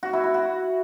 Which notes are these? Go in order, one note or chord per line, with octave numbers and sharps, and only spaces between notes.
F#4
E4
E4
F#4